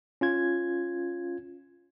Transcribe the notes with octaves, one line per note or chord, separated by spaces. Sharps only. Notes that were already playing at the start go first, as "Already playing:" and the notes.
C#4 F4 G#6